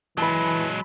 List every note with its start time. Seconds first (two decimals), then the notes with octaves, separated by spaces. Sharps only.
0.18 E3 F#3 G#3 A5 B5